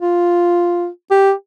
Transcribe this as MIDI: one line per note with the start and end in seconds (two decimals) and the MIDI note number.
0.01 0.88 65
1.11 1.33 67